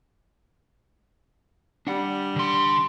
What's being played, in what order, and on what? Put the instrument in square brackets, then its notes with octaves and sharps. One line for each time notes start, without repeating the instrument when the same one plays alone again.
[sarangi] G3 [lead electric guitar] D4 F#5
[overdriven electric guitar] D3 C6